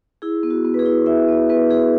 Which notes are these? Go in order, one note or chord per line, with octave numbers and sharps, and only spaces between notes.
E4 G#4
B3
F#4
B3
B4
G#4
E4
E4 E5
B3
B3 B4
E4 G#4